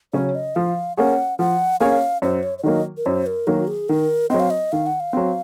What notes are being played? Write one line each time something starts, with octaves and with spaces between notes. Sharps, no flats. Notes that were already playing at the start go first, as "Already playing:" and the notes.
C#3 F#3 C#4 C#5
D#5
F3 F5
A#3 C#4 G#4 C#5 F#5
F3 F#5
A#3 C#4 G#4 C#5 F5
F#2 C5
C#5
C#5
D#3 F#3 A#3 D#5
A#4
F#2 C5
A#4
D#3 F#3 A#3 F#4
G#4
D#3 A#4
F#3 C4 D#5
F5
D#5
D#3 F5
F#5
F5
F#3 C4